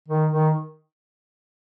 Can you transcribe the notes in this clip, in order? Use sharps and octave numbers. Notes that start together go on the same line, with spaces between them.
D#3
D#3